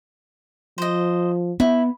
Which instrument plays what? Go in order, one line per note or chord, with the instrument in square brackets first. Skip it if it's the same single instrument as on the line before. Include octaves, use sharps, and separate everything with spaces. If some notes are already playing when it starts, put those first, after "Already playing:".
[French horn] F3 [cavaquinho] C5 D#5
[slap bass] B3 [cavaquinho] E4